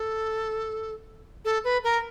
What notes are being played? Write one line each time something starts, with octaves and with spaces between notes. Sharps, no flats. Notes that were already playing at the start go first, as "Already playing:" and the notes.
Already playing: A4
A4
B4
A#4